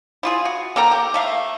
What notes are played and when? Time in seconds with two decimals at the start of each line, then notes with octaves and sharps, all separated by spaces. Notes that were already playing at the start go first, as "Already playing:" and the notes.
0.23 E4 F4 G#4
0.45 F#4
0.76 A#3 A4 G5 A#5
0.91 G4
1.14 A3 E5 F5